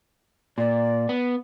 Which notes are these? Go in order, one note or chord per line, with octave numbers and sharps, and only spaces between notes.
A#2 D5
B3